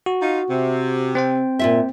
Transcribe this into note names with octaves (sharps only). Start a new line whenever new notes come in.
F#4
D#4 F4
C3
C4 C5 G5
A#2 F4 E5